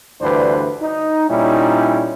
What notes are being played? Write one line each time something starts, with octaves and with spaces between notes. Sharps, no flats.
D2 G2 E3 D4 B4 C5
D#4
A#2 G3 C#4 D#4 E4